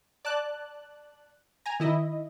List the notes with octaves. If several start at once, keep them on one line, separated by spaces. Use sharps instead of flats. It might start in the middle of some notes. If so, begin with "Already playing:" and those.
D5 A5 F#6
G#5 A#5
D#3 E4 D#5